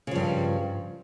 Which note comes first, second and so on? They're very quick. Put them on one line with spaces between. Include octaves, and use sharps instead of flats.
C#3 F3 G2